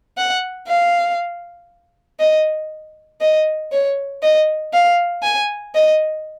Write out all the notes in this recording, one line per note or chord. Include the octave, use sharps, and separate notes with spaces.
F#5
F5
D#5
D#5
C#5
D#5
F5
G#5
D#5